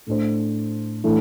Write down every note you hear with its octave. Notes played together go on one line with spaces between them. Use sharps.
A2 A3 D4 C5
A2 E3 A3 D4